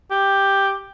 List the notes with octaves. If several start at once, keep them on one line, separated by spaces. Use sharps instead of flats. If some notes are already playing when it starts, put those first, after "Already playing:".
G4